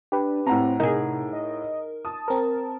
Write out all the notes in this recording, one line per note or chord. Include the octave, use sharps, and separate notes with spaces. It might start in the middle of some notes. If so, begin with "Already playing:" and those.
D4 G4 B4
A2 C4 F#5 A#5
C3 D#4 G#4 A#4
D#5
A5 D#6
C4 A#4